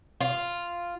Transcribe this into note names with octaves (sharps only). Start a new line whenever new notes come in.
F4